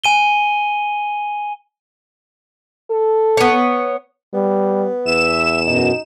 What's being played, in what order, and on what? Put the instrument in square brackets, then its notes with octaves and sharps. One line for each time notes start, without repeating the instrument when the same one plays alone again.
[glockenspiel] G#5 D#7 G7
[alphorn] A4
[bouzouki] B3 C#5
[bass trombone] G3 [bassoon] B3
[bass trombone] E2 [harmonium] E5 [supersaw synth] E7
[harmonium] F#2 B2 [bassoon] D#4